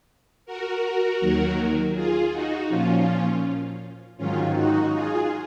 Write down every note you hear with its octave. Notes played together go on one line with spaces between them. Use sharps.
F#4 A#4
D#2 D#3 F#3
F4 G#4
D#4 F#4
A#2 F3 C#4 F4
G#2 D#3 F#3 C#4 F4
D#4 F#4
F4 G#4